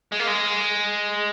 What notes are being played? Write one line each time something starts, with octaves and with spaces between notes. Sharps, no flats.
G#3
A#3
G#3